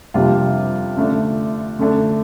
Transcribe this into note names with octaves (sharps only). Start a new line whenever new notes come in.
F2 C3 G3 A#3 D4 F4
D3 A3 D4
D3 A3 D4